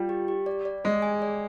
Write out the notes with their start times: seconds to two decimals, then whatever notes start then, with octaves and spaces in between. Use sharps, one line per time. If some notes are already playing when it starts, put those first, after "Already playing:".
Already playing: G3 F4
0.09 G4
0.28 G4
0.46 D5
0.65 D5
0.84 G#3 G#4
1.02 G#5
1.22 D5